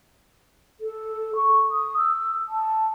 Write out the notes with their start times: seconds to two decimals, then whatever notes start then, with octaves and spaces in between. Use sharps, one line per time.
0.81 A4
1.36 C#6
1.71 D#6
1.98 E6
2.48 A5